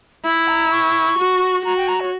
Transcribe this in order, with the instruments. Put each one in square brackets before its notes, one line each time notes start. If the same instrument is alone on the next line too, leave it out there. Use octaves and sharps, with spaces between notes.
[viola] E4 [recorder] E5
[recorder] A#5
C#6
[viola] F#4
[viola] F#4 [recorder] A#5
[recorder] G5
A#5
C#5